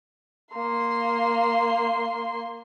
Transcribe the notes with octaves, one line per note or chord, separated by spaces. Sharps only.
A#3 C6